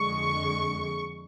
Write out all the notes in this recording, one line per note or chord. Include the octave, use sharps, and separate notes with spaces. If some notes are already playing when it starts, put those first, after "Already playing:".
Already playing: F2 D3 G#3 C#6